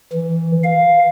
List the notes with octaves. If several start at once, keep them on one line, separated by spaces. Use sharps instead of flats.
E3
F5